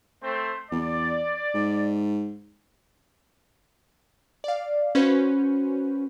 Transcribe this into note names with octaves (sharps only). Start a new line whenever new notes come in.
A3 C4 C5
E2 D5
G#2
D5 F5
C#4 F#4 B4 C5